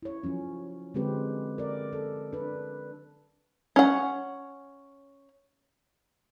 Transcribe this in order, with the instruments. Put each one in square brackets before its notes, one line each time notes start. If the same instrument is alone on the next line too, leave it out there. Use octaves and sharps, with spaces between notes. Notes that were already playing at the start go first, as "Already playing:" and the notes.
[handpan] E4 C#5
F3 F#3 C#4
D3 G#3 C4 G4 B4
A#4 D5
A4
D4 B4
[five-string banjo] C#4 F#5